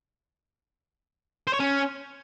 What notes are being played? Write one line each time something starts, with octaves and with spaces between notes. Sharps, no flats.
C5
C#5
C#4